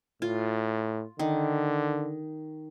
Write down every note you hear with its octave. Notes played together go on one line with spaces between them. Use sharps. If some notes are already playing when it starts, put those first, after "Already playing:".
A2 F4
D3 D#3